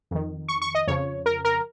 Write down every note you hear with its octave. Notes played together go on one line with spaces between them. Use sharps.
F2 D#3
C#6
C#6
D#5
F2 C#3 F3 C#5
A#4
A#4